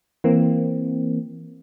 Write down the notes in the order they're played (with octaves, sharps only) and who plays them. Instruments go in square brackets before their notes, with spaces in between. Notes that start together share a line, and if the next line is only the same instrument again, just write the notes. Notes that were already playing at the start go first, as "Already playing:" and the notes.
[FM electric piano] E3 A#3 C4